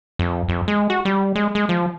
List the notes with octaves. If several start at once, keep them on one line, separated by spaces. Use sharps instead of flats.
F2
F2
G#3
F#4
G3
G#3
G#3
F3